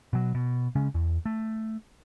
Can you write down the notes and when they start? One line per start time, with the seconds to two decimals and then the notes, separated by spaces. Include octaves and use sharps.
0.13 B2 F#3
0.35 B2
0.75 C#3 G#3 C#4
0.94 E2
1.26 A3